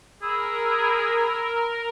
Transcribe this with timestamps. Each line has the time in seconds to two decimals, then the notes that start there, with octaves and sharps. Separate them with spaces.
0.22 G#4 A#4 B5 E6